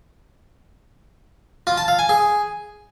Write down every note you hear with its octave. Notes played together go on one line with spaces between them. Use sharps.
F4
A5
F5
G#5
G#4